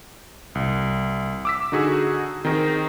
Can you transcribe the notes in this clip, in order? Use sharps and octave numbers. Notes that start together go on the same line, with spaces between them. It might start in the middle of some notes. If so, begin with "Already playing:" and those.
C2
D6 E6 B6
D3 D#4 F#4 G#4
D#3 C4 D#4 G#4 A#4